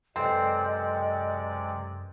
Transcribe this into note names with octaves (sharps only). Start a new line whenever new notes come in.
F#2 C3 G#3 C4 A4 B4 D5 D#5